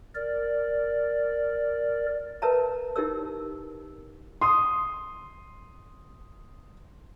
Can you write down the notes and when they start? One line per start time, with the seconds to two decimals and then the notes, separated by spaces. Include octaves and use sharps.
0.15 A#4 D5
2.42 A#4 B4 C#5 E5 A5 A#5
2.96 D#4 E4 G4 A#4 C#5 E6
4.41 C6 D#6